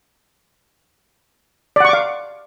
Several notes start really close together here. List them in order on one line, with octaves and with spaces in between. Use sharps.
D5 F#5 C#6 D6 F5